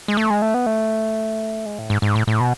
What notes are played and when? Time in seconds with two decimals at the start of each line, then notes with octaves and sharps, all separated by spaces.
0.08 G#3
0.17 A3
0.30 G#3
0.42 A3
0.54 B3
0.66 A3
1.66 G#3
1.78 A2
1.90 G#2
2.02 G#2
2.15 A2
2.27 A2
2.40 B2